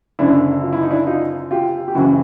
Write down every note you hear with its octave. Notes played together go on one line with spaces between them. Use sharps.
F#1 F#2 D3 D4 E4
F4
E4
D#4
D4 E4
D#4 F4
F4 G4
G4
F#1 F#2 C#3 E3 E4 F#4